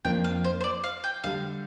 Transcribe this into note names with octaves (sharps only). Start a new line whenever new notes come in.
F2 F3 A#3 D4 F4 G5
F5
C5
C5
D5
F5
G5
D3 G3 D4 F5